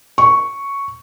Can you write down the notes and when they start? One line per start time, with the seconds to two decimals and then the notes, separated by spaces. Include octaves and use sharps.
0.18 C#6